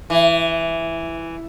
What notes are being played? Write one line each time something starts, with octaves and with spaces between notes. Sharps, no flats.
E3